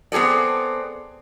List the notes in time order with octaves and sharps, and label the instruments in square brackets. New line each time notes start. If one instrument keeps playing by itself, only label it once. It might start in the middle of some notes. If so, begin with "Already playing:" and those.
[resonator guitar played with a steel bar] B3 C4 G#4 A4 D5